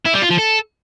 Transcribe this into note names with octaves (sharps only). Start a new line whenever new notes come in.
E4
G3
F4
F3
A4